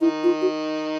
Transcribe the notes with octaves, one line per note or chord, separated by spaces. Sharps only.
D#3 D#4 E4
F4
F#4